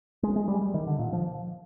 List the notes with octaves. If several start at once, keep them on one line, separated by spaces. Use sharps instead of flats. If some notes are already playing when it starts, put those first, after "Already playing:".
G#3
G#3
G3
G3
D#3
D3
A#2
F3